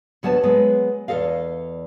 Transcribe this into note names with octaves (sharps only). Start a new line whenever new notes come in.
D2 F#3 B3 F#5 A5
F#3 G#3 B3
E2 F3 A4 D#5 F5